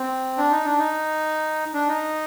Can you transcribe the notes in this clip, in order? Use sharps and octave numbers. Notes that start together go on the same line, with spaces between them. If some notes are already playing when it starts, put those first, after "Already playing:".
Already playing: C4
D4
D#4
D4
D#4
D4
D#4